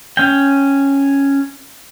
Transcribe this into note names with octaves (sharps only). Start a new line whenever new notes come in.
C#4 G5